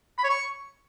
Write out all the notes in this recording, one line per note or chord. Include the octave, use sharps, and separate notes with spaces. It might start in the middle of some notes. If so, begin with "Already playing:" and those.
B5
C#5
C#6